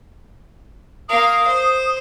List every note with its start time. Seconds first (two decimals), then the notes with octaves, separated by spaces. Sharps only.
1.09 A#3 F5 D#6
1.46 C5